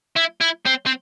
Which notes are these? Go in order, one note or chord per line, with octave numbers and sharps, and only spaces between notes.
E4
E4
C4
C4